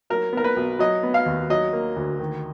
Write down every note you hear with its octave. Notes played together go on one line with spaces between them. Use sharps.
F#3 A#4
B3 A#4
B4
B1
F#3 D#5
B3
F5
D#2
F#3 D#5
A#3
D2
D#3